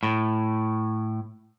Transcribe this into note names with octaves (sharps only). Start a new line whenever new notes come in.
A2